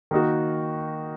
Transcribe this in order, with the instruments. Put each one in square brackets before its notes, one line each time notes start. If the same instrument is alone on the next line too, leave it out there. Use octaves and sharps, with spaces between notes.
[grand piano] D#3 A#3 D#4 F#4